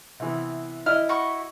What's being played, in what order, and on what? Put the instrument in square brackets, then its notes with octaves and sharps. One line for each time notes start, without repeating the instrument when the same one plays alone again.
[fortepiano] C3 E3 B3
[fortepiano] E4 D#5 [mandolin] F6
[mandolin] F#4 B5 C#6